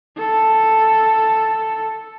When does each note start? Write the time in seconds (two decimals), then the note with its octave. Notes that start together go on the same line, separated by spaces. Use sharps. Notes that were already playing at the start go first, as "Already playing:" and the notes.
0.18 A4